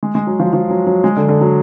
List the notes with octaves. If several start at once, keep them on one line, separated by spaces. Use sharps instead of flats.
G#3
G#3
F#3
F3
F3
F#3
F#3
G#3
D3
D3
F#3